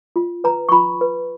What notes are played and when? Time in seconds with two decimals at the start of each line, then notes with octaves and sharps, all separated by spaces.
0.16 F4
0.44 B4 A#5
0.69 C#6
0.72 F4 B5
1.01 B4